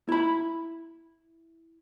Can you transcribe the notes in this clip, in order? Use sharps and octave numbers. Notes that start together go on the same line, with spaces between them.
E4 B5